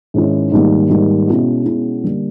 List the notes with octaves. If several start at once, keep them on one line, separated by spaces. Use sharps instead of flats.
G#2 D#3 G#3 C#4 E4
G#2 D#3 G3 A#3
G#2 D#3 G3 A#3
B2 G#3 C#4 E4
B2 G#3 C#4 E4
D3 G3 A#3 D4